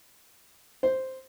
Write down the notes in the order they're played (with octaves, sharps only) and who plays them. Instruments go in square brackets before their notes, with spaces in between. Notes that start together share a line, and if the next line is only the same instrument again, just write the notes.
[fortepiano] C5